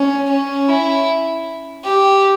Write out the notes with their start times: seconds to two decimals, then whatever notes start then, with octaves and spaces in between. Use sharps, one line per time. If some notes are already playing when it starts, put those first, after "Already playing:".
Already playing: C#4
0.29 C#4
0.68 E4
1.84 G4